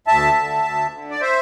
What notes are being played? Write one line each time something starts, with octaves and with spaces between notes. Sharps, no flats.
D2 E5 A5
D3
D2
D3
D5
C5 E5